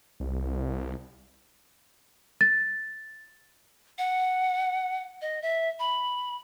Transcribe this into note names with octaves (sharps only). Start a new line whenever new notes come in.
C2
A6
F#5
D#5
E5
B5